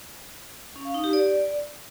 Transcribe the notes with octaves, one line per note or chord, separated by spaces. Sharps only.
C#4
F5
D#4
G4
D5